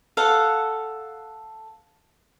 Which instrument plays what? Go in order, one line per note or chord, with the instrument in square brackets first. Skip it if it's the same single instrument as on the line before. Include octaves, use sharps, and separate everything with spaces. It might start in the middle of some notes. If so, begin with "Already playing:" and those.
[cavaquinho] A4 F5 F#5